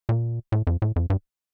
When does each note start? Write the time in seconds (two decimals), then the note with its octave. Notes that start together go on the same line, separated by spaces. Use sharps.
0.09 A#2
0.52 A2
0.67 F2
0.82 A2
0.96 F2
1.10 G2